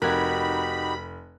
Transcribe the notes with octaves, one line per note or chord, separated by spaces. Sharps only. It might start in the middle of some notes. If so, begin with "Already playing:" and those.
F1 D#4 F#4 G4 A#4 B5 F#6 G#6